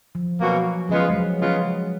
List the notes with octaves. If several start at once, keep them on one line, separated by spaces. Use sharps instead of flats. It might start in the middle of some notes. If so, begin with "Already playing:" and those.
F3
B2 F#3 A#3 C#4 F#4
C#3 F3 G#3 B3 F4
G#3
F#3
C#3 G#3 B3 F4